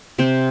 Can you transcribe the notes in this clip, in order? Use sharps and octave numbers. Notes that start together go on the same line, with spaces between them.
C3 C4 C5